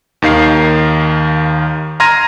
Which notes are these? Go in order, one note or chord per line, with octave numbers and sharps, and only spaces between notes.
D#2 D#3 F5 C7
A#5 C6 F6 G#6 A#6 D#7